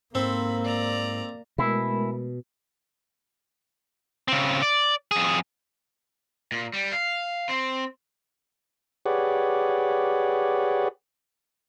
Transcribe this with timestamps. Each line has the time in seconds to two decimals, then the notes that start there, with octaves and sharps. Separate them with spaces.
0.15 G#2 A#3 C4 A4 C5 B5
0.64 D5 A#5
1.58 B2 G#3 A3 E4 A#4
4.28 C#3 C4
4.62 D5
5.11 F2 G#4
6.52 A#2
6.74 G3
6.93 F5
7.49 C4
9.06 G4 G#4 B4 C#5 D5 F#5